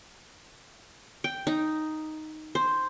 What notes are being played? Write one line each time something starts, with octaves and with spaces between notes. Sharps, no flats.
G5
D#4
C5